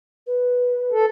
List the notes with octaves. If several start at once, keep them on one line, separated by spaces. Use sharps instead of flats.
B4
A4